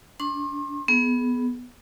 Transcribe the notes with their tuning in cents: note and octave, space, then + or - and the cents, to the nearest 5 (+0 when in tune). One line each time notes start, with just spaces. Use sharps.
D4 -25 C6 +40
B3 +0 G#4 +30